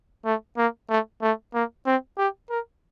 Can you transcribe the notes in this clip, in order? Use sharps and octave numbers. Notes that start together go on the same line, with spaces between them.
A3
A#3
A3
A3
A#3
C4
G4
A#4